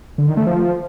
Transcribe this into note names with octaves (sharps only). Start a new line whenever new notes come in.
D3
D#3
A3
F3